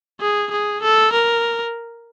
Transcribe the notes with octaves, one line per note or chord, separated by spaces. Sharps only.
G#4
G#4
A4
A#4